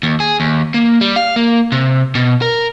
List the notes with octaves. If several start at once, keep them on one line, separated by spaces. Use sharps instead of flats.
D#2
G#4
D#2
A#3
G3
F5
A#3
C3
B2
A#4